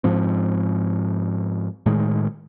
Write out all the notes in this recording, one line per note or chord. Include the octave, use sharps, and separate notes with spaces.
G#2 F3 C4
A2 D#3 G#3